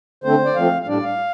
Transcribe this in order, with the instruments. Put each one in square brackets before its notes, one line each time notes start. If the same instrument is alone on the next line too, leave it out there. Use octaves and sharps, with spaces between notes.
[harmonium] D3 A3 C4 C5
D5
F3 A3 C4 F5
F5
A2 G3 D4 D5
F5